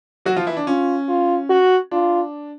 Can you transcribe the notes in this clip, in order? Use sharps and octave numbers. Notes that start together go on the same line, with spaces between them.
F#3 F#4
F3 F4
E3 E4
D4
C#4 F4
F4
F#4
D4 F4